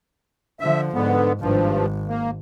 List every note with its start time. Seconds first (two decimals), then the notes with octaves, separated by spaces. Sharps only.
0.60 D3 F3 E5
0.94 G#2 D3 B3
1.40 G#1 G2 F3
2.08 A#3